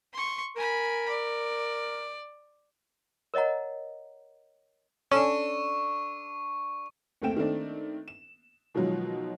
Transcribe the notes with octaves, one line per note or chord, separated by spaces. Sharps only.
C6 C#6
A#4 G#5 B5
D5
A#4 C#5 D#5 F#5 A#5
C#4 D4 A4 C#6
F#1 D2 A3 C4 G5 E7
D#3 A3 C4 D4
E7
B2 D#3 F3 F#3 G#3